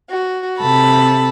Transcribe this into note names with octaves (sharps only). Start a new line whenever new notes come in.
F#4
C3 A4 A5 B5